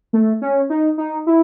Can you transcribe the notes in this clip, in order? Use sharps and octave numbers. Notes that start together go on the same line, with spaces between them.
A3
C#4
D#4
D#4
E4